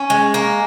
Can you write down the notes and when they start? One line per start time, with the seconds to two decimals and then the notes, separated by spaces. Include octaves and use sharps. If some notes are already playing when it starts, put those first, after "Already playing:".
Already playing: C#4
0.10 G#3
0.34 A#3